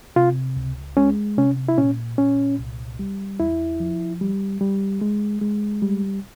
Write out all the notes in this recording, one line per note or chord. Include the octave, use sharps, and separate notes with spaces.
C3 F4
C#2
G#3 C#4
C3 C#4
E4
A#2 C#4
A#2 C#4
C2
G3
E2 E4
F3
G3
G3
G#3
G#3
G3